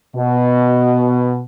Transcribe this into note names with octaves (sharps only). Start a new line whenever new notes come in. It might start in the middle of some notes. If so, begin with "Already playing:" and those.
B2